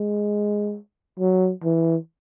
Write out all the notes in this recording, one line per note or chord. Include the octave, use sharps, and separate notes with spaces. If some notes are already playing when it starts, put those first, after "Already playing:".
Already playing: G#3
F#3
E3